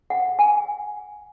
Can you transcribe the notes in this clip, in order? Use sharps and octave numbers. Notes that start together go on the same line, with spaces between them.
F#5
G#5